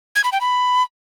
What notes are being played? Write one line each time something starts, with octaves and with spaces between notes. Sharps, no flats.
G#6
B5
G5
B5